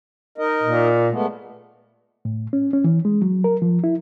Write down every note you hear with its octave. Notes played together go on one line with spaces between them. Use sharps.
D#4 A#4 D#5
A#2
G#3 A3 B3
A2
C#4
C#4
E3
G#3
F#3
A#4
F3
E4